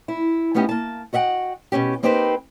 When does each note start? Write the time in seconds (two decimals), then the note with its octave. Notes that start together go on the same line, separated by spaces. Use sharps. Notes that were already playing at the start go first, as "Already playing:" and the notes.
0.08 E4
0.54 A3 B3 C#4 D#4 G4
0.69 A#3 A5
1.13 F#4 D#5 E5 F#5 G5
1.72 B2 E3 C#4 G4
2.03 A#3 C4 D#4 G4 B4 C5